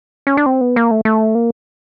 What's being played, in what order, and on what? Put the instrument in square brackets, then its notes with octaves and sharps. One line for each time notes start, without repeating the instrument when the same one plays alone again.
[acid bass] C#4
D4
C4
B3
A#3
A3
A3
A#3